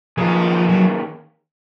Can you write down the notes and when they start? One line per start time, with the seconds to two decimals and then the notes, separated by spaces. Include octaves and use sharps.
0.18 D#3 F3 A#3 C#4 G#4 B4
0.69 F#3